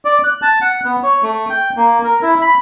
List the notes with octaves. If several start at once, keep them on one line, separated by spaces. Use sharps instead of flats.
D5
F#6
A5
F#5
B3
C#5
A3
G5
A#3
A#4
E4
B5